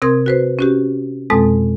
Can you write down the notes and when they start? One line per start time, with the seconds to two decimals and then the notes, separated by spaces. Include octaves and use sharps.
0.02 C3 C4 A#4 C6 D#6 G#6
0.26 F#4 B4 C5
0.59 C#4 F#4 G4
1.30 F2 B2 G#3 C4 A4 D#6